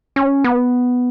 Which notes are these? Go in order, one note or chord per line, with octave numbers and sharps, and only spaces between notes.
C#4
B3